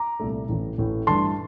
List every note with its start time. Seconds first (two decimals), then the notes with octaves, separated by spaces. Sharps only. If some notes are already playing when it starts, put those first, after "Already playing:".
Already playing: A#5 D6
0.20 C2 A#2 A3
0.49 A1 A2 E3
0.78 A1 A2 E3
1.07 G2 E3 A3 D4 A5 C6